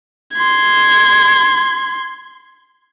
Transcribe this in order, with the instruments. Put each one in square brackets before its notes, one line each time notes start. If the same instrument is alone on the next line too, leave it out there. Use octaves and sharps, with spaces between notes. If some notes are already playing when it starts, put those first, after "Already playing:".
[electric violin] C6 G#6